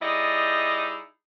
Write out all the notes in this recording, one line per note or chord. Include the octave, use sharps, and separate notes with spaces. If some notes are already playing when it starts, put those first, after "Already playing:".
G3 D#4 E4 G#4 D5 D#5